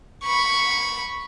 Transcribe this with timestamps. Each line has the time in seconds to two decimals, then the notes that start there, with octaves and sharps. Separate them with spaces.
0.24 B5 C#6